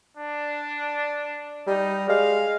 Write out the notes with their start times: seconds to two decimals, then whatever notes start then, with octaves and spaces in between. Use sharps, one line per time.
0.17 D4
1.67 G3 D#4
2.09 G#3 F5